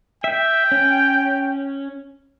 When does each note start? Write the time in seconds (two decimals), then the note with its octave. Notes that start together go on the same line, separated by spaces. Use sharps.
0.24 E5 G5
0.72 C#4